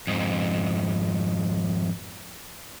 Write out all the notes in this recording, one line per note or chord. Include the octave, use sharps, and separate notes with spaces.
F2 G#2